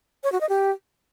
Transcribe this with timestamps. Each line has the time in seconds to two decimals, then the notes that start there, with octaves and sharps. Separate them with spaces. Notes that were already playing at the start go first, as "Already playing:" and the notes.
0.24 C#5
0.32 F#4
0.41 D#5
0.49 G4